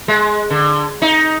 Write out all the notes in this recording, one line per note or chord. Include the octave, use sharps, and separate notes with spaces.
G#3
D3
D#4